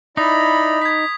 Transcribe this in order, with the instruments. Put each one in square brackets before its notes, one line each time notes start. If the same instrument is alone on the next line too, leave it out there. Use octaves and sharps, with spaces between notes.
[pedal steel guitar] D#4 [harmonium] E4 D5 D#5 [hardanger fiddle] B5 [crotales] D#6
[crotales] G#6 B6